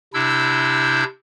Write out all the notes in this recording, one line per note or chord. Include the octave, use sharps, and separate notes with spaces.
C3 D4 E4 E6 G6